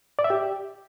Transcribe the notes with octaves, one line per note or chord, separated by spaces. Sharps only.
D5
E5
G4